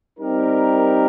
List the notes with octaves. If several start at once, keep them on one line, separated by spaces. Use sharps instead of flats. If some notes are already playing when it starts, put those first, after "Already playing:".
G3 C4 D#4 G4 A#4